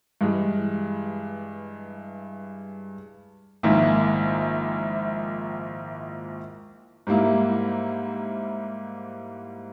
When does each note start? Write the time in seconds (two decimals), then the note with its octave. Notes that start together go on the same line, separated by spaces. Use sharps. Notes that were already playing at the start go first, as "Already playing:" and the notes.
0.21 G2 E3 G#3
3.63 A#1 G#2 D#3 A#3 E4
7.07 G#2 G3 A#3 E4